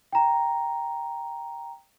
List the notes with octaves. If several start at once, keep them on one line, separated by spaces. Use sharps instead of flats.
G5 A#5